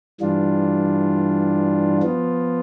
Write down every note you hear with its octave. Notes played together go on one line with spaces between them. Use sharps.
G2 E3 G3 D4 F4
F3 B3 F4